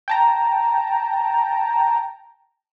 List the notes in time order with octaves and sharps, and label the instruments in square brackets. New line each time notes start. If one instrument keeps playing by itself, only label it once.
[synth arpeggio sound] G5 A5 A#5